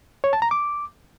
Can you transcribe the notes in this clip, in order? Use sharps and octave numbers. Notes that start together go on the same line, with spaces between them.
C#5
A5
A#5
D6